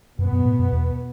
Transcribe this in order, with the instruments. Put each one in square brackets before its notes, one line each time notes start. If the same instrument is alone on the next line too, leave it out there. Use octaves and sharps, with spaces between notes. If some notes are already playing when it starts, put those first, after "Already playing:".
[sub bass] F#2 [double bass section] B2 B3
[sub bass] F#2
A2
F#2
E2